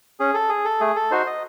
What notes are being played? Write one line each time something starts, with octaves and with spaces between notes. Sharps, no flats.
C#4 G#4
A4
G#4
A4
A3 G#4
A4
D#4 F#4 C5
D#5